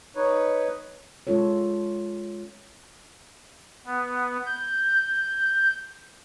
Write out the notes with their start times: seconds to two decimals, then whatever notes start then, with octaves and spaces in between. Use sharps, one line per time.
0.16 D#4 B4 C#5
1.27 G#3 C#4 F4 A4 C#5
3.85 B3
4.46 G6